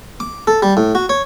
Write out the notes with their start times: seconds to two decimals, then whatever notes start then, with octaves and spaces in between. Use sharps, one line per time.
0.20 D6
0.47 A4
0.62 G3
0.77 A2
0.95 F#4
1.09 C#5